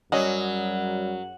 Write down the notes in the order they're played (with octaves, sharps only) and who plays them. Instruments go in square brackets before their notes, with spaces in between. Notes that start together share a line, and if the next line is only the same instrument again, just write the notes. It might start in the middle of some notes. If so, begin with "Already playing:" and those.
[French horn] F#2 [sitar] F#3 [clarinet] G3 [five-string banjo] C#4 G#4 D#5